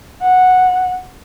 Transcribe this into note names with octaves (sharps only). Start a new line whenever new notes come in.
F#5